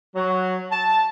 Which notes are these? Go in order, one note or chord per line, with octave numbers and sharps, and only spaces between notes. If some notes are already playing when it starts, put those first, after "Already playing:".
F#3
A5